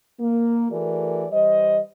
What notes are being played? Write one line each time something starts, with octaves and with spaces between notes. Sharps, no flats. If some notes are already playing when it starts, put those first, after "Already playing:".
A#3
E3 A3 F#4 G#4 A#4 D5
E3 G3 C5 D#5